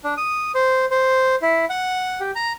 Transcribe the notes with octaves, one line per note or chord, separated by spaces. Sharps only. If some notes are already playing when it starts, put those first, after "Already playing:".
D4
D#6
C5
C5
E4
F#5
G4
A#5